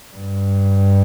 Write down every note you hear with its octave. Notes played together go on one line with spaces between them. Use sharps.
G2